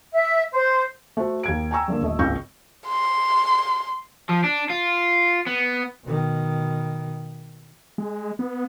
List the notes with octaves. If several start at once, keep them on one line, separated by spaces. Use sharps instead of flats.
E5
C5
A3 F#4 C5
D#2 G#6 D7
G5 G#5 A#5 C#6 E6
G2 D3 A#3
D#1 A3 D#5
G#1 C#2 C#6 G6 A#6
C6
F3
D4
F4
B3
B2 D#3
G#3
B3